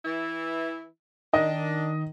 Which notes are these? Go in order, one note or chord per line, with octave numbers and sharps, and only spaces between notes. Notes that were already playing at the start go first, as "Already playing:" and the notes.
E3 E4
D#3 D4 D#5